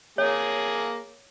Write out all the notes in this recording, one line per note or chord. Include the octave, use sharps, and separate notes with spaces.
A#3 G#4 C#5